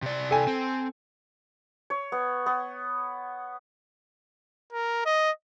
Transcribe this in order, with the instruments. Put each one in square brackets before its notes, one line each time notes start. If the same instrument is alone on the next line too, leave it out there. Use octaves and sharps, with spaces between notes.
[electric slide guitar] C3 D5
[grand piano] A4 G5 G#5
[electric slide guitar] C4
[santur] C#5
B3
B3
[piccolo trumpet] A#4
D#5